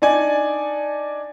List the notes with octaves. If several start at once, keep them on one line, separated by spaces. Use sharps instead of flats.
D4 D#4 D5 G#5